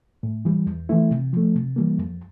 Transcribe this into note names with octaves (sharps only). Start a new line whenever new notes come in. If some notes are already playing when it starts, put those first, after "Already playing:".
A2
E3 G3
E2
E3 A3 E4
C3
F3 A3
C3
E3 G3 A#3
F2